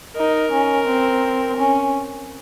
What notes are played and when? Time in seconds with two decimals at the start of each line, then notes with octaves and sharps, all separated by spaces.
0.17 D#4 A#4
0.52 C#4
0.88 C4
1.58 C#4